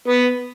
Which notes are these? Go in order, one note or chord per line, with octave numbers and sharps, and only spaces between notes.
B3